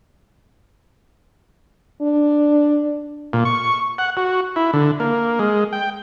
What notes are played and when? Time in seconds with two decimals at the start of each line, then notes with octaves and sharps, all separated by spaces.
2.01 D4
3.33 A#2
3.45 C#6
3.98 F#5
4.17 F#4
4.56 E4
4.73 D3
5.00 A#3
5.39 G#3
5.73 G5